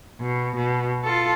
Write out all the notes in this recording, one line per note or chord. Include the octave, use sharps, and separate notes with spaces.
B2
B2
F4 A4